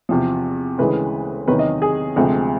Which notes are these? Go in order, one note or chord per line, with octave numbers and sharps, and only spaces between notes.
E2 C3 F3
D2 C#3 E3 G#3 B4
E2 C3 D#3 F#3 B4
D#5
G#4
D2 C3 F3 G#3 C4